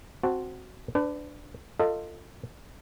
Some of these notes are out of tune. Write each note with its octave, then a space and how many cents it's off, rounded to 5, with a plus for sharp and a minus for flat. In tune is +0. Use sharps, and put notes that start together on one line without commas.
C4 +0 F#4 -5 A5 +0
D4 +0 B4 +35
F4 +0 A4 +30 D#5 +5